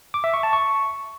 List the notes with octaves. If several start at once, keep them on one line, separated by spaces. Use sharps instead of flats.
D6
E5
C#6
A5
C#6